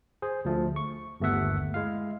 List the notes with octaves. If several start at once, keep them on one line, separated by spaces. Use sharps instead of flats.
G#4 C5
D2 F3 A3
C#6
G1 D#2 A3 B3 E5 F#5
G#3 E4 F5